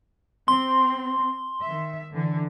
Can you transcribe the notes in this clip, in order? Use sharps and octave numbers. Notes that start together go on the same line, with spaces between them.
C4 C6
D#3 E5
D3 E3